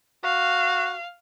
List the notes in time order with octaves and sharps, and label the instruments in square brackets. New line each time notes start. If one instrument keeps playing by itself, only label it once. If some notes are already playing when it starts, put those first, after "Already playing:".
[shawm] F#4 [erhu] F5